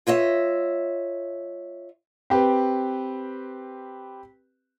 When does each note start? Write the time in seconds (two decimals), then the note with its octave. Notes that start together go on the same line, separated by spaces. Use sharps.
0.07 F4 C#5 D#5 E5
2.30 C4 G4 B4